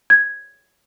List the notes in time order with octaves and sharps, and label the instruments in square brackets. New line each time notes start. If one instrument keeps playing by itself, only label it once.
[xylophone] G#6